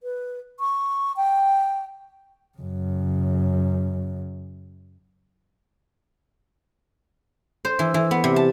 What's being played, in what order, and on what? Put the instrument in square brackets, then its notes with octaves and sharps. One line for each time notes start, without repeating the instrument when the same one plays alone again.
[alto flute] B4
C#6
G5
[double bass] F#2 C#3
[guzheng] C5
E3
E3
B3
C3
A5